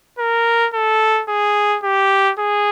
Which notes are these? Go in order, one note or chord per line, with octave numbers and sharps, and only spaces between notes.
A#4
A4
G#4
G4
G#4